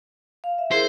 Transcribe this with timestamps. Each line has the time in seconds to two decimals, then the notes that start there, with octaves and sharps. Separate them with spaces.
0.44 F5
0.58 E5
0.71 E4 G#4 A#4 C5